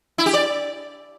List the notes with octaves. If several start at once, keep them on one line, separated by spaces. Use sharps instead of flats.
E4
G4
D5